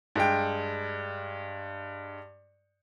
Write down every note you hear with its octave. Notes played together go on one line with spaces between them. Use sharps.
G2 G#3 G5